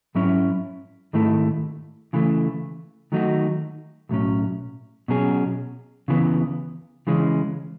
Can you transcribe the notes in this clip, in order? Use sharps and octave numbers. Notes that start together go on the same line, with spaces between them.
G#2 F#3 C#4 E4
G#2 D#3 A3 E4
C#3 E3 A3
D#3 F#3 A3 D#4 F#4
B1 A2 F#3 C#4
B2 F#3 C#4 G#4
C#2 C#3 E3 B3
C#3 E3 G#3 C#4